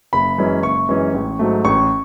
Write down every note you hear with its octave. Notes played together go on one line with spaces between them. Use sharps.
F#1 B5
F#2 E3 G#3 C#4
F#1 C#6
F#2 E3 G#3 C#4
A1
G#2 F#3 A3
A1 C#6